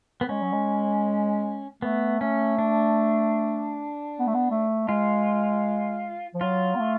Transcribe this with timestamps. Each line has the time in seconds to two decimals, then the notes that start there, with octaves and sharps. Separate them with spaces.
0.21 B3
0.29 G#3 C#4
0.42 F#3
0.53 G#3
1.82 A3 B3
2.21 A3 C#4
2.58 D4
4.19 B3
4.27 A3
4.34 B3
4.51 A3
4.88 G#3 F4
6.34 F3
6.41 F#3 F4
6.75 B3
6.79 A3